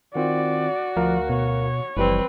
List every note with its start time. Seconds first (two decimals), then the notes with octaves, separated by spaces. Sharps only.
0.15 D#3 C4 F4 F#4 D5
0.97 D2 F3 A#4 F5
1.30 B2 C#5
1.97 F#1 E3 F3 G3 C4 B4